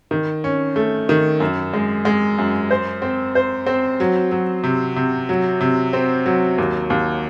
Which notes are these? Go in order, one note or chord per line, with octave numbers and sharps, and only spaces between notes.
D#3
C#4
A3
D#3
F#2
G#3
G#3
F#2
C5
C4
C5
C4
F#3
F#3
C3
C3
F#3
C3
C4
F#3
D#2
D#2